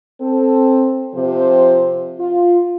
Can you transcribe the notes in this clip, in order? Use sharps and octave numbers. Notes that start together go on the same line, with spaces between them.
C4 A4
C3 F3 C5
F4